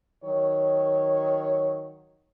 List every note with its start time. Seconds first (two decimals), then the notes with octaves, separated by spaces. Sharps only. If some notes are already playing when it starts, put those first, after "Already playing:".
0.24 D#3 F#3 C#5